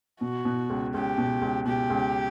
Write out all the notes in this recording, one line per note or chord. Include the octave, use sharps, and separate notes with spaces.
B2 F#4
B2
C#2
C#2 G4
B2
C#2
B2 G4
C#2